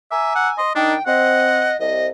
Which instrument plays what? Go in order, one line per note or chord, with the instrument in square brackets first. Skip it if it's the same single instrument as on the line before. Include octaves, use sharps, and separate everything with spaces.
[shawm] E5 [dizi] G#5 [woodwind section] A#5 D6 E6
[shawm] F#5
[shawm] D#5 [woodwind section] C6
[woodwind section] D#3 D#4 [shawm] D4 [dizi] G5
[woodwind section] C4 [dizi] D#5 [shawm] F#5
[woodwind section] C2 [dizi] D#5